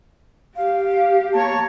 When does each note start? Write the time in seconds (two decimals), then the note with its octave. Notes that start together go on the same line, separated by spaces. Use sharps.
0.56 G4 F5
1.33 A#3 C#5 A5